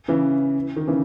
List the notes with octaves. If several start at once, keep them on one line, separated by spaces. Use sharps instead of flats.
C#3 E3
D#3
C#3 E3